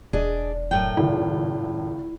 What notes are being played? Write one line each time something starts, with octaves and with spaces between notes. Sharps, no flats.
E1 D4 G#4 D#5
F#2 A2 A3 G5
G#1 C#2 E4